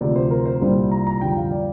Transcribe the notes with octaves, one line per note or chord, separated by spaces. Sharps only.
D2 C3 F3 D5
C5
A#4
C5
C2 A#2 G3
A#5
A#5
F2 D3 G3 G5
F5
D5